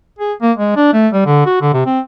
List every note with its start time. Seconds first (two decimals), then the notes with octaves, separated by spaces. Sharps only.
0.19 G#4
0.42 A#3
0.57 G#3
0.76 D4
0.93 A3
1.13 G3
1.26 D3
1.46 F#4
1.62 D3
1.74 C3
1.86 C4